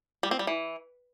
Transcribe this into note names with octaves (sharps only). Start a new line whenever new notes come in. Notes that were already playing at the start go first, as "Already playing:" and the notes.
G3
C4
G3
E3